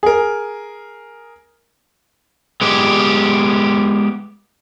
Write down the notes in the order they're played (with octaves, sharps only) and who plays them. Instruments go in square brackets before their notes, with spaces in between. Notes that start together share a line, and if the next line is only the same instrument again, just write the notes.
[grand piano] G#4 A#4
[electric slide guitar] G#3 B3 G4